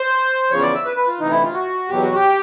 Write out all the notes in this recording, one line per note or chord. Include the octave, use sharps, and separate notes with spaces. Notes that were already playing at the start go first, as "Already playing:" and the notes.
Already playing: C5
E2 C#3 F3 C#5
D5
E5
B4
B4
F4
D2 C3 E3 D#4
E4
F4
F#4
E2 B2 F#3 G4
F#4
G4